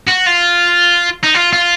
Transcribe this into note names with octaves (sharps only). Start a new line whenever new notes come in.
F#4
F4
D#4
F4
F4